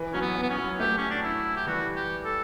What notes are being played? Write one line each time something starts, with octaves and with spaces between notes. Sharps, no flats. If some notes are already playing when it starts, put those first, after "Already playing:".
Already playing: E3
F#3 C#4
B3
F#3
B3
C#4
F#3
F#3 A3 G4
C#4
D4
E4
G4
E3 G3 F#4
G4
A4